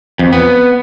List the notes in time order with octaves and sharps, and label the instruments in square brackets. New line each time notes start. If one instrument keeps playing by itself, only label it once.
[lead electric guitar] F2
B3